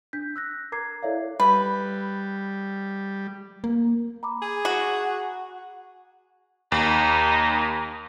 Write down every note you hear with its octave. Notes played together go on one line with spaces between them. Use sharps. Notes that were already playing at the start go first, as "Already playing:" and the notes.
D4 G6 B6
E6 F#6 A#6
A#4 A#5 D6 G#6 C7
E4 A4 C#5 D5 E5 F5
G3 B4
A#3
A#5 B5 D6
G#4
F#4
D#2 D#4